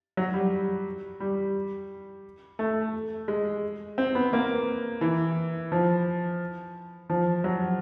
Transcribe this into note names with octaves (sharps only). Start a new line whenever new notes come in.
F#3
G3
G3
A3
G#3
C4
B3
A#3
E3
F3
F3
F#3